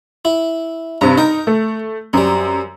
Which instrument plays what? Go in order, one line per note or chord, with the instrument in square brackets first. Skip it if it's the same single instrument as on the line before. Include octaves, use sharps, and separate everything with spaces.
[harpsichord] E4
[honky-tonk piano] G2 C3 [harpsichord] A#5
[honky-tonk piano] D#4 [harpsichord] A#4 G5
[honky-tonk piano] A3
[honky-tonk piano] F#2 [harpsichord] G3 C4